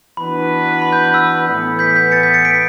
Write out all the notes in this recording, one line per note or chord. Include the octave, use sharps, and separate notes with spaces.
E3 B3 D4 F#4 B4 B5
B5
G6
G6
E6
A2 E3 B3
G6 B6
G6 B6
A6 C#7
G6 B6
A6 C#7
B6 D7